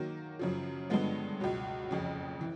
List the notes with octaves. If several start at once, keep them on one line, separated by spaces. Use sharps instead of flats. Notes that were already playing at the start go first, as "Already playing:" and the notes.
Already playing: D#3 F#3 A#3
F#2 C#3 F3
G2 D3 F3 G#3 B3
C#2 B2 F#3
F#1 F2 C#3
E3